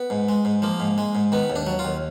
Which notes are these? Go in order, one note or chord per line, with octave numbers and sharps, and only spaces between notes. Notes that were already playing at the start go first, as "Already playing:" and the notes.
Already playing: B3
G#2
G#3
G#2
F3 A#3
G#2
G#3
G#2
D#3 B3
D#2
D4
F#3
F4
D#2